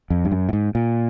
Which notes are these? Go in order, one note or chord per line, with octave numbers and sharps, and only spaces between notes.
F2
G2
F#2
A2
G#2
A#2